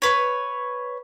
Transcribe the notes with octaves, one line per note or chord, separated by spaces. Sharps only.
B4 C#5